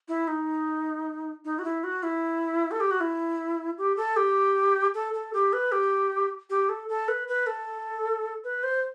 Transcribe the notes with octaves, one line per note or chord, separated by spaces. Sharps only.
E4
D#4
D#4
F#4
E4
F#4
E4
A4
G4
F#4
E4
G4
A4
G4
A4
A4
G4
B4
G4
G4
A4
A4
B4
B4
A4
B4
C5